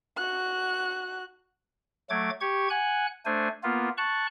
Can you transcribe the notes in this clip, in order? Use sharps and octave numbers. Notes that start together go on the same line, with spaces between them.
F#4 F#6
F#3 A3 D6 G#6
G4 C#6 G#6
F#5 G#5 F#6
A3 D4 C5 G#5
A#3 B3 F4
A5 C#6 F#6